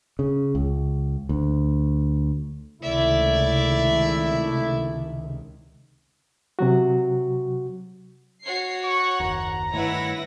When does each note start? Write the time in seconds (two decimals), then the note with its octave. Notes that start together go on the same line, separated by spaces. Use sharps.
0.19 C#3
0.55 C#2
1.29 D2
2.82 C#2 C3 D#3 A3 E4 D5 E5
6.59 C3 F#3 F#4
8.44 F#4 C#5 C7
8.84 F#5 C#6
9.20 F#1 D#2 A#5
9.72 G2 D#3 A3 E4 B4 C#5 F#5 A#6